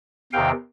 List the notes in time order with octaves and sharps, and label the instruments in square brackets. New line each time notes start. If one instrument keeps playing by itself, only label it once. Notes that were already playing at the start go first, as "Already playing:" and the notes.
[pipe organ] E2 C3 D#3 F5 G5